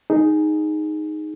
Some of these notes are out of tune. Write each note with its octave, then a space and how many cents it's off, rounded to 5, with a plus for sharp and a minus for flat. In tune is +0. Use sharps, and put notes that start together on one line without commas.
D#4 +0 G#4 +0